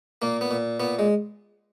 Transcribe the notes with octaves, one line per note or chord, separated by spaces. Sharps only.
A#2 A#3
B3
A#2
A#2 B3
G#3